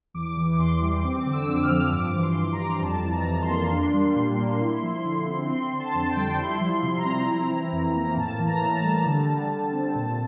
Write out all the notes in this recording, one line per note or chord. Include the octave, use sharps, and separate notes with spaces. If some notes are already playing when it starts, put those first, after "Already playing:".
E2 D6
E3
D6
E2 C6
G3
C4 D6
D3
E6
F2
F6
F3
G2 D6
E3
C6
G2
A#5
G3
F2 A5
E3
A#5
F2
C6
A#3
D4
G3
A#2
A#3
E4
F3
D3
C4
C4 C6
D3
A5
F2
G5
G3
E4 C6
F3
C6
C3
A#5
C4
E4
E3
F2
A#3
A#5
A2 A5
E3
A#5
A2
A5
G3
D3
G3
D3
C4
A#2